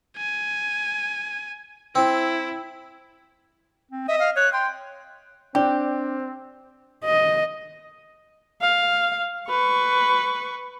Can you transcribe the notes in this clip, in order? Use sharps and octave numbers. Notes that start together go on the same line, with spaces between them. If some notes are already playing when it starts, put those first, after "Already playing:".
G#5
C4 E4
C4
D#5 E5
F5
C#5 F#6
G5 C6
C4 D4 G4
D#5
F5
B4 C#6